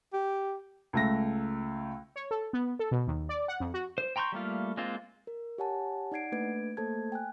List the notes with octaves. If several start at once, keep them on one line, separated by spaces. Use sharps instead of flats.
G4
C#2 A3 A#6
C#5
A4
B3
A4
B2
D#2
D5
F#5
F2
F#4
C5
G5 A#5 C6 C#6 G6
G3 A3 A#3 F4
G#3 A#3 C4 F4
A#4
G4 C#5 F#5 G#5 A5
D#4 D5 F#5 G#6 C7 D7
A3 A#3 D4 B4 G#6 D7
A3 A#3 A4 C5 A5 G#6
G5 G#5 F#6